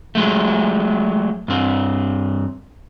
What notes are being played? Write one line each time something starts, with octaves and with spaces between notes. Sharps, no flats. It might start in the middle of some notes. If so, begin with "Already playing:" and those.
F#3 G#3 A3
G2 C4